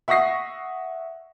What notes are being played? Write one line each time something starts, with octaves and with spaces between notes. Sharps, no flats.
E5 F#5 C#6 D#6 A#6 C7